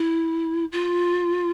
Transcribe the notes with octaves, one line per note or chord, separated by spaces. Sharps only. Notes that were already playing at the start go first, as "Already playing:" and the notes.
Already playing: E4
F4